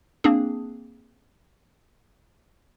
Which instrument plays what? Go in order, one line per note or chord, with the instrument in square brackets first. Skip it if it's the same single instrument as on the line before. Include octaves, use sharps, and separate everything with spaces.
[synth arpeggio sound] A#3 C4 D4 G#4